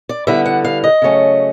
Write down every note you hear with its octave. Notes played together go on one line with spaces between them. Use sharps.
D5
D3 G3 B3 E4 E5
F#5
F5
D#5
C#3 F#3 A3 C#4